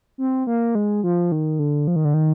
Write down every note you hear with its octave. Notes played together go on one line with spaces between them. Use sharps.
C4
A#3
G#3
F3
D#3
D3
F3
D#3
D3
D#3